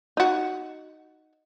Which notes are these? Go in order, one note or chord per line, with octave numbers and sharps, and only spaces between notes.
D#4 F#4